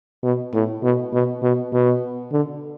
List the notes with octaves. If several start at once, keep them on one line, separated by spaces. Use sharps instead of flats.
B2
A2
B2
B2
B2
B2
D3